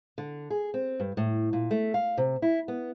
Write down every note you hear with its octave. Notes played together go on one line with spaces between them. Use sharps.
D3
G#4
C4
G2
A2
A#2
A3
F5
C3
E4
B3